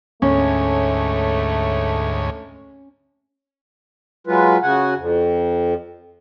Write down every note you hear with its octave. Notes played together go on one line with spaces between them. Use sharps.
D2 G#2 A3 C#4 C#5
F#3 G#3 F4 B4
C#3 F#4 F#5 G#5
F2